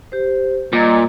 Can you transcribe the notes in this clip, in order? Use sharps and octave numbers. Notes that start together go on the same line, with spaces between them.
G4 C5
A#2 G3 D#5 A#5